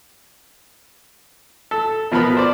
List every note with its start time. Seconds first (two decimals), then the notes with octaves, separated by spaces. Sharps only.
1.71 A4
2.11 B2 F3 B3 A#4 B5
2.37 C5 D5